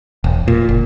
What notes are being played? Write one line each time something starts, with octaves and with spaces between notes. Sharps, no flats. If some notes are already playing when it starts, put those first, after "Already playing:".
E1
A#2
F#1